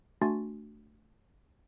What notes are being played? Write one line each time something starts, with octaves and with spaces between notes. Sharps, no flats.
A3 D4 F#4 G#5 C6 A6